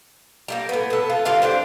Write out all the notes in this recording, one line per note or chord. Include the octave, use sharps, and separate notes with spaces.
G3 A3 A#3
A2 B3
B3 A4
F4
D3 G3 F4 F5
D4 G4 C5